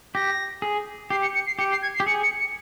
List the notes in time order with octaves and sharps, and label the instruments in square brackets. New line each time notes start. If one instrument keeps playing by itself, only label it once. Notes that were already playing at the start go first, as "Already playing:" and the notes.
[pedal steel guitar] G4 [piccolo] A#6
[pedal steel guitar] G#4
[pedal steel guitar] G4 [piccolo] C7
[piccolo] C#7
C#7
C7
[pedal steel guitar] G4 [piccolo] C#7
[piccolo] C7
G#6
C7
[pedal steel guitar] G4
[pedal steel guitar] G#4 [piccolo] C#7
[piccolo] C#7
C#7